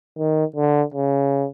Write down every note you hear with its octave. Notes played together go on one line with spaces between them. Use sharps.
D#3
D3
C#3